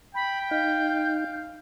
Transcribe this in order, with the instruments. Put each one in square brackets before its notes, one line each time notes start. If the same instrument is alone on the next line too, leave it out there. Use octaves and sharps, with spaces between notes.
[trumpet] G5 [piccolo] B5
[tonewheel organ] D#4 [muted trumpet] F5 [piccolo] G6